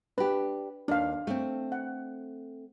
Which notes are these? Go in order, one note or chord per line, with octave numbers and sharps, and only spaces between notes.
D4 G4 B4
D#2 D4 F5
A3 C4
F#5